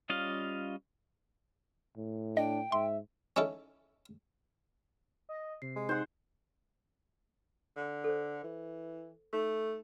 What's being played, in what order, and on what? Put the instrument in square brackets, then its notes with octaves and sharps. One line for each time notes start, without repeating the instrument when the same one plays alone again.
[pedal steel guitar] G3 C#4 F4 D#5 F5
[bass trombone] A2
[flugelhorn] D4 [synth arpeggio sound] D#5 [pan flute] G5
[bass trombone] G#2 [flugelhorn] E5 [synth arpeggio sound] C6
[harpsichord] C#4 D#4 E4 A4
[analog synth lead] D#5
[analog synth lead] C3 [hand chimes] C7
[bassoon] G#3
[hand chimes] D#4 [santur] C5 F#5
[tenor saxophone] D3
[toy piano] A4 C5
[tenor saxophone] E3
[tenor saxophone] A3 [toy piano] D#4